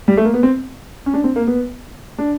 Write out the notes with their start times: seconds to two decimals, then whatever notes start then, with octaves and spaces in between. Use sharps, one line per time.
0.08 G3
0.17 A3
0.25 A#3
0.34 B3
0.43 C4
1.06 C#4
1.14 D4
1.24 C4
1.36 A#3
1.47 B3
2.18 D4